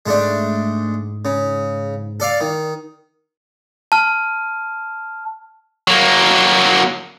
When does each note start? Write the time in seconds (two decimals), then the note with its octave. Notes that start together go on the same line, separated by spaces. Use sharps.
0.06 G#2 G#3 A3 D4
1.25 C#3
2.20 A4 D5 F5
2.40 D#3
3.92 A5 F6
5.88 F#3 A#3